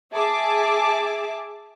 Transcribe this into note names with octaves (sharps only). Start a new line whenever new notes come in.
G#4 E5 A5 D6